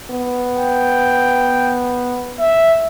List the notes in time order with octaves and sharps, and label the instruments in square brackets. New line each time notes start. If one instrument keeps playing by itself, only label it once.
[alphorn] B3
[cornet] G5
E5